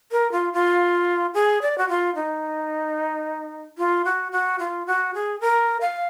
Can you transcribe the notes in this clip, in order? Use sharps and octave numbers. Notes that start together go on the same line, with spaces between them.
A#4
F4
F4
G#4
D5
F#4
F4
D#4
F4
F#4
F#4
F4
F#4
G#4
A#4
F5